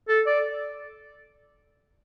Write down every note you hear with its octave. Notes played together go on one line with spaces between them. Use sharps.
A4
D5